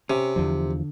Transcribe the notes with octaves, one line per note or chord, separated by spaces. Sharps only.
C3 C#4
E2 D3 F3